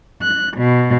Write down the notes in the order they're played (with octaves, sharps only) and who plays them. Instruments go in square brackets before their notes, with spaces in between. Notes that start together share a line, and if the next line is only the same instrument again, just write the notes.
[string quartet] F#6
B2